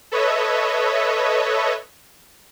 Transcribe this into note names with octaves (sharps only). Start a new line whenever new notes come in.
A4 B4 C#5 D#5 E5